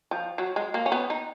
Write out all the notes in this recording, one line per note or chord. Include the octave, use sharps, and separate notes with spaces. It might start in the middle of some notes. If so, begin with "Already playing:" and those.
F3
F#3
G#3
A#3
C#4
B3
D#4